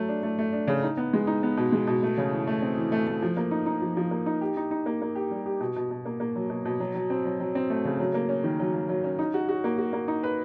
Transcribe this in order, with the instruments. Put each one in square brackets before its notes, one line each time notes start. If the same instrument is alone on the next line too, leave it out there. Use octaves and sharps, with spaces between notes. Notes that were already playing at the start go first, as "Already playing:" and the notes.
Already playing: [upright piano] F#3 A3
D4
A3
A3
D4
C#3
D#4
B3
G#3
D#4
B3
B2
G#3
B2
A3
C#3
E3
A3
C4
E3
A3
A3
F3
A#3
D#4
D#4
F3
F3
A#3
D#4
G4
D#4
D#4
A#3
A#3
G4
G3
G4
B2
B2
B2
A#3
A#3
F#3
B2
B2
F#3
F#3
C4
F#3
F#3
C4
A3
C#3
F#3
A#3
C#4
D#3
F#3
F#3
F#3
C#4
D#4
F#4
F#4
A#3
F#4
A#3
D#4
B4